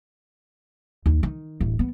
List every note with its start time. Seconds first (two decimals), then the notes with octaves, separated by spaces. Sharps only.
1.06 D#2
1.23 D#3
1.60 D1 A1
1.79 B3